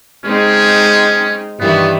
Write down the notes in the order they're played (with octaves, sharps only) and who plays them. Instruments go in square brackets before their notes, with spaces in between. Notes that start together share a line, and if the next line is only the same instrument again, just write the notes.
[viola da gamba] G#3 C4 D#4 [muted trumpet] C#4
[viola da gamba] G2 D#3 E3 [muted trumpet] B3